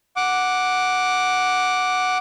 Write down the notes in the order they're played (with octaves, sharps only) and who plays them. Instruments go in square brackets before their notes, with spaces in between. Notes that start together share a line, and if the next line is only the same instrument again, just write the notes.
[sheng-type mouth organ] F#5 D6